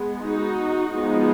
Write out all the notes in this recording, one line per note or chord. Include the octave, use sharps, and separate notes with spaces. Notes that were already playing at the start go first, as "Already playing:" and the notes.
Already playing: G#3 B3
D#4 F#4
F3 G#3 B3 D#4